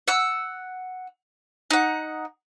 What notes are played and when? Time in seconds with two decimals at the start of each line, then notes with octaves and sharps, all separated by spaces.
0.08 F#5 E6
1.71 D#4 F#5